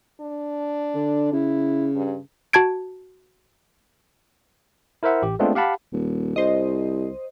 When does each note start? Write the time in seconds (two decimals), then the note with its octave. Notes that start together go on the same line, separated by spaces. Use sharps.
0.21 D4
0.95 D3
1.33 C#3 E4
1.96 G2
2.53 F#4 A5 G#6 D7
5.03 E4 A#4 C5 E5 F#5
5.22 A1 G4
5.39 G#3 A3 B3 C4 D4 F4
5.55 G4 F5 F#5 A5 B5
5.93 D#1
6.36 C2 C5 D#5